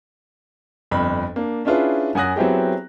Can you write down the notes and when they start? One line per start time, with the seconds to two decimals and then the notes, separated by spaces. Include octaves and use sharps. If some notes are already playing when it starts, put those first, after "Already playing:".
0.91 G1 F2 B5
1.36 A#3 D4
1.65 C#4 D4 E4 F4 G#4 B4
2.15 F#2 F#5 G#5 D#6 F#6 A#6
2.36 F#3 B3 C4 E4 G4 G#4